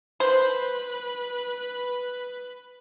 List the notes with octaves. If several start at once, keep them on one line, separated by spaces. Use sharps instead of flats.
B4 C5